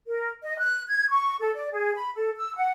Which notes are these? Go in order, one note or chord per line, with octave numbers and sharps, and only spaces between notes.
A#4
D#5
F#6
G#6
C#6
A4
D5
G#4
B5
A4
E6
F#5